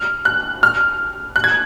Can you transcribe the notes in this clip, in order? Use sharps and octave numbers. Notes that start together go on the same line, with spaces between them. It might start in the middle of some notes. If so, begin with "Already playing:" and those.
Already playing: F6
F#6
F6
F#6
G#6